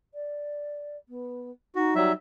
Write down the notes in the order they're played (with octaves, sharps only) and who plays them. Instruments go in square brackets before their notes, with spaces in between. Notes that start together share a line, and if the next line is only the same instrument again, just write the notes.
[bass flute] D5
B3
[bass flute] D#4 [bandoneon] F#4
[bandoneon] F#3 G3 E5